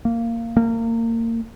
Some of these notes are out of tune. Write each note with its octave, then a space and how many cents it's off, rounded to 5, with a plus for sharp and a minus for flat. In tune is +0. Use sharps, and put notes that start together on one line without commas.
A#3 -15
A#3 -30